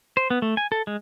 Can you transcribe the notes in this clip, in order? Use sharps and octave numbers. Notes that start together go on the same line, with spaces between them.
C5
B3
A3
G#5
A4
G#3